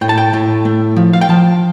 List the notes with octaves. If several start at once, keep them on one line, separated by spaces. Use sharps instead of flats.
A2 G5
A5
G5
A2
A3
F3
F5
G5
F3 A5